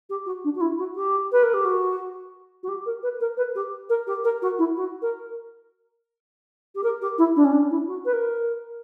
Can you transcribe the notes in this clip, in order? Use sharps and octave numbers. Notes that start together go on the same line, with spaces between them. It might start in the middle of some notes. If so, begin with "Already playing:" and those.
G4
F#4
D4
F#4
E4
F#4
G4
B4
A#4
G4
F#4
F#4
G4
A#4
B4
A#4
B4
G4
A#4
G4
A#4
F#4
E4
F#4
A#4
G4
A#4
G4
E4
D4
C#4
D4
E4
F#4
B4
A#4